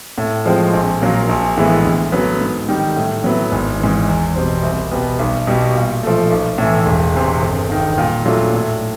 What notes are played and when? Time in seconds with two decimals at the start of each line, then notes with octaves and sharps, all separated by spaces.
0.18 A2
0.45 F3 G#3 C4
0.74 A#1
1.02 A#2 F#3 A#3
1.29 A#1
1.57 A2 E3 G#3 B3
1.85 D2
2.12 D3 F#3 B3
2.41 G#2
2.68 D#3 G3
2.96 A2
3.24 F#3 B3 E4
3.52 G#1
3.80 G#2 E3
4.08 E2
4.36 B2 G3 C4
4.63 C2
4.91 B2 G3 B3
5.19 B1
5.47 B2 G3
5.75 A#2
6.03 F3 A3
6.31 B1
6.58 A2 E3
6.86 E1
7.14 E2 C3
7.42 G1
7.70 G2 D#3
7.98 A#2
8.25 F#3 A3 D4 F4
8.54 A2